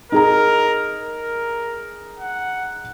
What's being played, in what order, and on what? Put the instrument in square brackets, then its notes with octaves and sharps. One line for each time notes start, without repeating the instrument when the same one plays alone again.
[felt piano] D#4 G#4 A#5 [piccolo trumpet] A#4
[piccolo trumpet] A#4
F#5